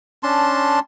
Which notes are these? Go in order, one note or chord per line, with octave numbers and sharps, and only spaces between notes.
C#4 D4 A5 C6